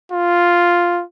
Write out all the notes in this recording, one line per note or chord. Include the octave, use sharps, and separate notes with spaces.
F4